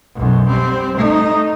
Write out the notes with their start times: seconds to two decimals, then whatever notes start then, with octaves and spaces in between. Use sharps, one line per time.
0.16 B1 F#2
0.48 G3 C4
0.97 A3 D#4